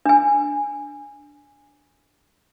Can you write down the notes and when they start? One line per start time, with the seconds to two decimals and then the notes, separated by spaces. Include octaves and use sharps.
0.06 D4 G#5